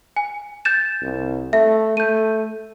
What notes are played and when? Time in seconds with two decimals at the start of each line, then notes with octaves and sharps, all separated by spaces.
0.16 G#5
0.65 G6 A6 E7
1.02 C2
1.53 A3 E5
1.97 A3 G6 D#7